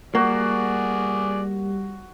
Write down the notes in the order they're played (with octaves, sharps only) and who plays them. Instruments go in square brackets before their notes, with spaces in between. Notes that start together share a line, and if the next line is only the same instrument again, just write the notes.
[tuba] G3 [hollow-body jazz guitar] A#3 [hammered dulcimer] F#4 [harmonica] G#4 D5